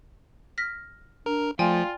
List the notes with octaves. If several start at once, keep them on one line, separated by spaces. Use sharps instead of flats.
F6 A#6 B6
D4 A#4
F3 A3 F4 D5 G5 G#5